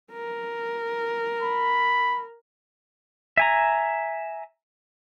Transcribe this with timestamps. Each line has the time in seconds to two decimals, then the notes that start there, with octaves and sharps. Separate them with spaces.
0.12 A#4
1.42 B5
3.37 E5 G#5 A#5